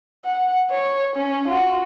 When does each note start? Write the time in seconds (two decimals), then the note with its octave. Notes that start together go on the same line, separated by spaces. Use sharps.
0.25 F#5
0.71 C#5
1.16 C#4
1.48 F4 F#4